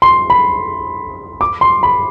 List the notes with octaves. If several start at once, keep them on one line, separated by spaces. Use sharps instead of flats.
C6
B5
D6
C6
B5